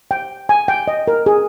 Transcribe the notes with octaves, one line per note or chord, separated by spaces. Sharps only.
G5
G#5
G5
D#5
A#4
G#4